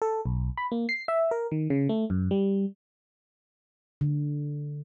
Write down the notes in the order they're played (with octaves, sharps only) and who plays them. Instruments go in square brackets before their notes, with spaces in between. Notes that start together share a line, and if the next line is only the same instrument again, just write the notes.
[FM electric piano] A4
B1
B5
A#3
C7
E5
A#4
D#3
C#3
A3
F#2
G3
[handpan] D3